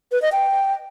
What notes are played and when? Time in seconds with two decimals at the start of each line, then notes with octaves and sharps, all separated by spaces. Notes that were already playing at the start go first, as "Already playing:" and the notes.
0.12 B4
0.22 D#5
0.32 G5